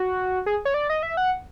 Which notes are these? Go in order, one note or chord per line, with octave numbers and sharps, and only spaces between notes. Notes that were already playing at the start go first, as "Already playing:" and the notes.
Already playing: F#4
G#4
C#5
D5
D#5
E5
F#5